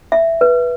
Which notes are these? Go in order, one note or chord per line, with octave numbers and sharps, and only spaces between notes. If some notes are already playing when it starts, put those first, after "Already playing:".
E5
B4